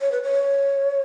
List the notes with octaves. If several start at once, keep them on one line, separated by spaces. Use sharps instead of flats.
C#5
B4
C#5